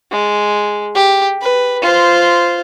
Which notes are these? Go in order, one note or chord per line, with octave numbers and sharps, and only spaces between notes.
G#3
G4
B4
F4 C5